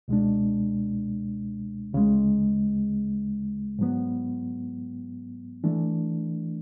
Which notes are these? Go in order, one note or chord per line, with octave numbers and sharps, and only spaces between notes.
C#2 B2 G#3 D4
D2 C#3 G#3
G#2 F#3 B3
E3 A3 D4